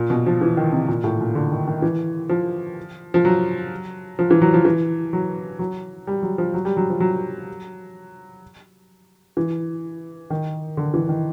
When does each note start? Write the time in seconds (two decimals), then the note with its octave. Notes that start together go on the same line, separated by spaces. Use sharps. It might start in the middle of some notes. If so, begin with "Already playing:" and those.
Already playing: A#2
0.10 B2
0.26 F3
0.41 E3
0.57 D#3
0.72 C3
0.88 A#2
1.04 A2
1.21 A#2
1.35 D3
1.52 D#3
1.67 D#3
1.82 E3
2.29 F3
3.14 F3
3.25 F#3
4.19 F3
4.31 E3
4.42 F#3
4.54 F3
4.65 E3
5.13 F#3
5.59 F#3
6.07 G3
6.22 F#3
6.38 F3
6.54 F#3
6.65 G3
6.77 F#3
6.90 F3
7.00 F#3
9.37 E3
10.30 D#3
10.77 D3
10.94 E3
11.09 D#3